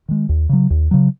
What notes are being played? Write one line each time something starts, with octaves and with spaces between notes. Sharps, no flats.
D#3 G#3
D#2
C#3 F#3
D#2
C#3 F#3